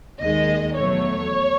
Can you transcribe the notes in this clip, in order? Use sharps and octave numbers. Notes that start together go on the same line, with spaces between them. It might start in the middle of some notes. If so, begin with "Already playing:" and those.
D#2 D#3 G#3 D#5
E2 B2 F#3 A3 C#5